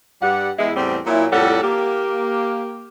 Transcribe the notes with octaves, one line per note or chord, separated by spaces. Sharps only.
G2 G3 F#5
E2 G#3 E4
E2 A2 G3 C4
A#2 F#3 E4
F2 A2 G3 A4 C#5 F#5
A#3 G4